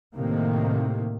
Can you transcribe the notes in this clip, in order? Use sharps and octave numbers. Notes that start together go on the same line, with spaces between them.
A2 C3 D#3 A#3